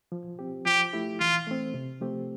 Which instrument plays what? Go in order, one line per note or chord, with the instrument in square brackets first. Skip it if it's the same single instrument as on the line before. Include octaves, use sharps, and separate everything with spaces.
[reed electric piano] F3
C4 G4
[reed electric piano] F3 [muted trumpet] G4
[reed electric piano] A3 E4 G4
[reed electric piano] E3 [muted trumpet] F4
[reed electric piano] A3 C4
C3
F3 A3 C4 G4